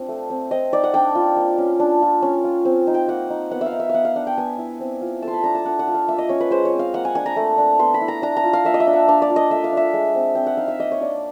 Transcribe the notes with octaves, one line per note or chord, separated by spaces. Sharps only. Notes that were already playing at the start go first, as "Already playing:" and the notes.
Already playing: C4 D4 F4
A3
C4
C4 D#5
D#4 D5
F#5
D4 G5
F4
A#3
C#4
D4
F4
C#4
F4
C4
D#4
G5
A#3 F#5
D#4
B3 F#5
E5
F5
D#4
E5
B3 F5 F#5
F5
D4 F#5
G5
B3 G#5
E4
C4
F4
A3 A5
C6
B5
D4 A#5
A5
D4 F#5
F#5
F4
F5
A#3 E5
D#5
C#4 C#5
B4
G#3 C5
C#5
C4
F5
A#3 F#5
G#5
D4 G#5
A#5
A3
D4
B3 C6
B5
E4
A#5
D4 A#5
A#5
F4
F5
A#3 E5
D#5
E5
D4
F#5
D4 F5
D5
F4
D#5
A3 E5
F5
D4 E5
G#3
C4
C4 G5
F#5
D#4 F5
E5
A#3 D#5
C#5
D4 D5